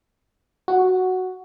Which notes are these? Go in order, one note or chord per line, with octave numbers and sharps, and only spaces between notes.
F#4